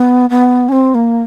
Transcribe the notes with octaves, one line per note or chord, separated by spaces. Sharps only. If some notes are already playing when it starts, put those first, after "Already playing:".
Already playing: B3
B3
C#4
C4
A#3